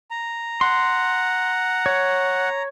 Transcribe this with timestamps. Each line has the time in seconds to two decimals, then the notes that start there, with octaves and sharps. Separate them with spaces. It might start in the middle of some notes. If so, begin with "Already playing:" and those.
0.11 A#5
0.61 F#5 C6
1.86 C#5